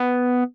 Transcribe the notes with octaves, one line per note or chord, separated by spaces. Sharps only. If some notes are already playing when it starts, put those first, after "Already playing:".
Already playing: B3